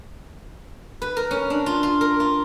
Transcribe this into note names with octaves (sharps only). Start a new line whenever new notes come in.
B4
A#4
C#4
D4
F4
F4
A#4
F4